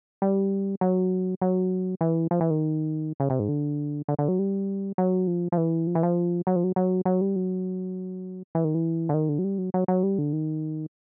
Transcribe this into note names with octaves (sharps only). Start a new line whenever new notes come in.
G3
F#3
F#3
E3
F3
E3
D#3
C#3
C3
G#2
D3
D3
D3
F#3
G3
F#3
F3
F3
E3
F3
E3
F3
F#3
F3
F#3
F#3
F#3
G3
F#3
E3
D#3
E3
D3
D#3
D3
F#3
G3
F#3
F#3
F#3
G3
D3
D#3